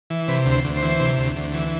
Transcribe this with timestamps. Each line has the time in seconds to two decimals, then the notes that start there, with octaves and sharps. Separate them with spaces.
0.10 E3
0.28 C3 B4
0.46 D2
0.52 C5
0.64 D2
0.77 C5
0.83 E3
1.00 C3
1.18 D2
1.36 D2
1.54 E3